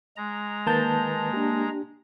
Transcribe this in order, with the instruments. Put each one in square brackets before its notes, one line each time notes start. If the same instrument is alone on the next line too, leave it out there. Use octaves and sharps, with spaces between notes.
[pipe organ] G#3 A#5
[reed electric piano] D#3 B4 A6 [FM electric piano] A#3 A5 G6
[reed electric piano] D4 G4